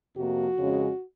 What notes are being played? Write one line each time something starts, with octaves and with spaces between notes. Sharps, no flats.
F2 C3 F3 A#3 F#4
F2 C#3 G#3 C#4